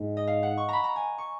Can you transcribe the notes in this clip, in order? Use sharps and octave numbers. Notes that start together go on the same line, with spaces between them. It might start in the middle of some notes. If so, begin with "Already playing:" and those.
Already playing: G#2
D#5
F5
F#5
C#6
A#5 B5
A#5
G#5
C#6